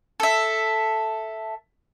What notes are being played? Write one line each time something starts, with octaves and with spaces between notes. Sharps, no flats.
A4 E5